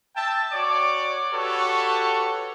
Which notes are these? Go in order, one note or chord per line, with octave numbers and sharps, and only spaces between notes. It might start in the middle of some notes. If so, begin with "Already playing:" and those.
E5 G5 A5
F#4 C#5 D5 D6
F#4 G4 A4 B4 C#5